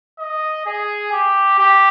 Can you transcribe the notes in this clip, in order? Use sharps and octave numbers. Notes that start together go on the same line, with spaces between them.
D#5
G#4
G4
G4